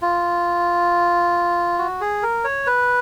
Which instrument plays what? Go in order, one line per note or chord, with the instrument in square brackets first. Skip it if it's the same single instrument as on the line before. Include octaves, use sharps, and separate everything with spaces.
[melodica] F4
F#4
G#4
A#4
C#5
B4